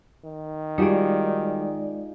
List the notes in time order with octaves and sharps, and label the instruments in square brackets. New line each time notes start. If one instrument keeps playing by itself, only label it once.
[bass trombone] D#3
[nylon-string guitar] G3 F#4 [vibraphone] G#3 D5 [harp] D#4 F4 G#4